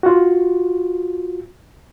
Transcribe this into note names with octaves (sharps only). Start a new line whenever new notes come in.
F4 F#4